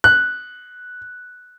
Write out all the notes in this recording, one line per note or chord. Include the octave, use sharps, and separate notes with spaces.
F#6